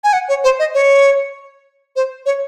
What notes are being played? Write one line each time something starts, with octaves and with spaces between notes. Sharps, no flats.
G#5
F#5
C#5
C5
D#5
C#5
C5
C#5